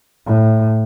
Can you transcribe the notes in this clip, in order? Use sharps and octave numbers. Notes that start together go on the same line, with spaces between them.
A2